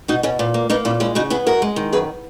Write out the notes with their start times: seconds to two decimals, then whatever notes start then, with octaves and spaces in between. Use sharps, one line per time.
0.08 B2 D#4 F#4
0.23 B2 C#4
0.39 A#2 B3
0.54 A#3
0.70 A#3 B3 D#4
0.85 A#2 C#4 E4
1.00 G#3 C#4 E4
1.15 C#3 D#4 F#4
1.30 B3 E4 G#4
1.47 F#2 F#4 A#4
1.62 G#3
1.76 D#3
1.92 F#2 G#4 B4